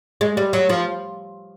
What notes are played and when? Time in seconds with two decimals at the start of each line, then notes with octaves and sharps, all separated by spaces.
0.21 G#3
0.37 G3
0.53 F#3
0.69 F3